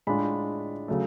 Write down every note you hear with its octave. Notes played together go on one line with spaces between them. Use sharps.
A2 G#3 D4 F4 B5
C#3 F#3 A3